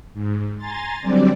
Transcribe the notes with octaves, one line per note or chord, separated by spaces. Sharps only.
G#2
G#5 A#5 C6 A6
D3 F#3 G3 C4 D5